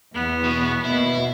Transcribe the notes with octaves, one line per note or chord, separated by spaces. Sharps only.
E2 B3
B2
D#2 B2 E4